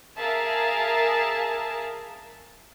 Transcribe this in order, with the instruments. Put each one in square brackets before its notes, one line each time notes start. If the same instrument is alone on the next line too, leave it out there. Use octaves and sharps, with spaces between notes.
[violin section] G#4 A#4 E5 F5 A5